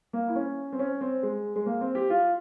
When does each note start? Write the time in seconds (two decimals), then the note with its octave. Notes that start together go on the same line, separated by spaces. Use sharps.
0.13 A#3
0.28 E4
0.35 C#4
0.72 C4
0.79 C#4
1.01 C4
1.23 G#3
1.56 G#3
1.66 A#3
1.81 C4
1.95 G4
2.10 F4